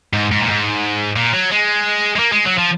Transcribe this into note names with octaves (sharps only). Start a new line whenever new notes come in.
G#2
G#2
A#2
G#2
A#2
F#3
G#3
G#3
A#3
G#3
F#3
F3